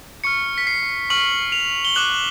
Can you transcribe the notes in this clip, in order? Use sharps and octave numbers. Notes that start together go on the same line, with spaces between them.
C#6 F6 C#7
B6
C7
C#6 F6 F#7
F7
G7
D6 F#6 F#7